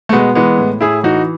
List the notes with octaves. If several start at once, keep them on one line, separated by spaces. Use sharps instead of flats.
A3
B2 G#3 B3
E3 G#3 B3
A2
A2 E4 G#4
E3 D#4 F#4